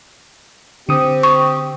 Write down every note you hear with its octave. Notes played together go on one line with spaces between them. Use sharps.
D3 C4 G4 D#6
C#6